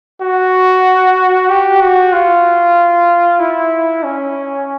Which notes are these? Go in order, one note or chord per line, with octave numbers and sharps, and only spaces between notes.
F#4
G4
F#4
F4
E4
C#4